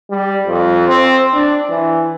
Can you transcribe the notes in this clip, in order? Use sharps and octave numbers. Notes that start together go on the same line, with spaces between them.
G3
F2
C4
D4
E3